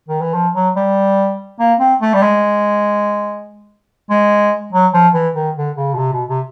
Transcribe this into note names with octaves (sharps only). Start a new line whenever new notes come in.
D#3
E3
F3
F#3
G3
A#3
C4
A3
G3
G#3
G#3
F#3
F3
E3
D#3
D3
C#3
B2
C3
B2
C3